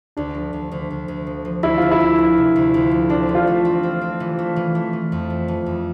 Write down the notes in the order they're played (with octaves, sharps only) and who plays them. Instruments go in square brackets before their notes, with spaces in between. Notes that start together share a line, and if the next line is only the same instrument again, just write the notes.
[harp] D2 [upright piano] D4
[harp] F3
D2
D2
D2
D2
F3
F3
[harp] D2 [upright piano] E4
[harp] D2 [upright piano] F4
[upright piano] E4
[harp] D2
F3
C3
D2
D2
F3
[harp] C4 [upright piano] D4
[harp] E3
[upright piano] F4
[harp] A3
C4
C4
C4
E3
A3
E3
A3
E3
F2
A3
E3
F2